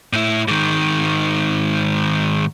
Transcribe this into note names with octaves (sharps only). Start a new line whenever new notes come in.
A2 E4
G#2 D#3